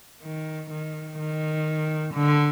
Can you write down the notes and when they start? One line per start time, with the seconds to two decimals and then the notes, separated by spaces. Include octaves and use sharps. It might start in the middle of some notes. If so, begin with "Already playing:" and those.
0.22 D#3
0.71 D#3
1.19 D#3
2.14 D3